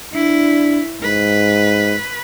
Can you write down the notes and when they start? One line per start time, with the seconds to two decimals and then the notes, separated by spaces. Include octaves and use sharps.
0.14 D4 E4
1.02 G#2 B4